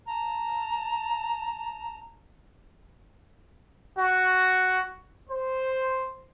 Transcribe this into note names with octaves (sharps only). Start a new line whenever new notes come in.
A5 A#5
F#4
C5